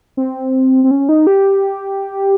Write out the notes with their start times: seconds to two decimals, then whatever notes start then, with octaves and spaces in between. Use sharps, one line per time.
0.17 C4
0.84 C4
0.91 C#4
1.09 D#4
1.27 G4